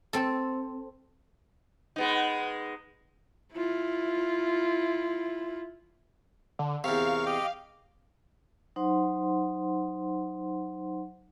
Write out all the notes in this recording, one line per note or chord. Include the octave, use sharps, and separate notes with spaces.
C4 A4
G#3 B3 D#4
E4 F4
D3
E2 C3 A#4 F5 C#6
F5
G4 D#5 G5
F#3 D#4 C5 F#5 C6